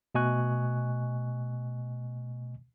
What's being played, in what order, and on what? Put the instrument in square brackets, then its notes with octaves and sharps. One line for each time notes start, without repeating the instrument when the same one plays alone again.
[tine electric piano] B2 A3 D#5 G#5 C#6 F#6